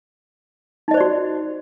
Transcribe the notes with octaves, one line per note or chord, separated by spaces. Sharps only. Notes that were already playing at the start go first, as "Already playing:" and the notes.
D#4 F#4 C5 D5 D#5